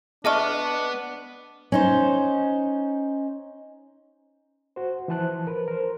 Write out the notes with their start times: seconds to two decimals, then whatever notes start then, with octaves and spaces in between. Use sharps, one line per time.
0.25 B3 D4 G#4 D#5 E5 A5 C#6 F6
1.72 C#4 D#4 C5
4.76 F#4 C5
5.08 E3 F3 C5 A5 F#6
5.47 A#4 B4
5.68 A#4 C5